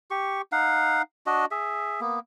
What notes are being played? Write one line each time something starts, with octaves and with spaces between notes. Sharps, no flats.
G4 C#6
D#4 F5 F#5
D4 F#4 D#5
G#4 E5
A#3 B3